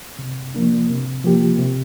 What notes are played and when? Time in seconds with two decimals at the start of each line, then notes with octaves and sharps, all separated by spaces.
0.19 C3
0.54 F3 A#3 D4
0.90 C3
1.24 F3 A#3 G4
1.59 C3